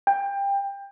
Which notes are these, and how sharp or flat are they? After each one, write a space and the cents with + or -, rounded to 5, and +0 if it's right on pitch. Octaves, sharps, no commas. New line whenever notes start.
G5 +20